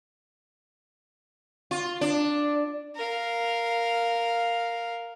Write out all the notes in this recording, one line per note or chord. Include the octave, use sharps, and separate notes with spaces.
F4
D4
A#4 F5